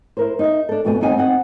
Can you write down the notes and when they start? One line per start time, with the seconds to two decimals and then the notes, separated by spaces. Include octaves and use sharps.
0.17 E4 A#4 C5
0.39 D#4 E5
0.69 D4 A4
0.85 F2 B2 A3 G#5
1.01 D#2 C4 D#4 F#5 G#5
1.16 C4 D#4 D#5 F#5